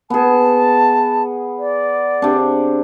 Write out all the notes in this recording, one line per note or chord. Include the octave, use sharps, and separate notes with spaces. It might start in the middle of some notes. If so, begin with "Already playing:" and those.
B3 G#4 A5
D5
C3 D4